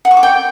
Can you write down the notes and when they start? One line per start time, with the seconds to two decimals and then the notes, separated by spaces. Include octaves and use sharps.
0.05 F#5
0.11 C#6
0.17 D6
0.23 G5